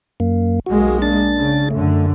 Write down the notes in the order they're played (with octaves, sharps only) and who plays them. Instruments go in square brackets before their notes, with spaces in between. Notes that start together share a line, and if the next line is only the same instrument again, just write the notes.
[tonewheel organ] F#2 A#3
[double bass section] B1 G#3 A#3 [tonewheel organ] F#4
[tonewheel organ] D4 A6
[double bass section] C#3
[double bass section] F#2 D3 [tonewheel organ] A3